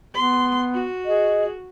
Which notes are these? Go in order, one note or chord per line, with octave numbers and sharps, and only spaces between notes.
B3 C6
F#4
G#4 D#5